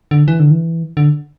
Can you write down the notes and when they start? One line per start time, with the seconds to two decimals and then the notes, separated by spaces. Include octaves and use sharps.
0.11 D3
0.28 E3
0.40 D3
0.51 E3
0.97 D3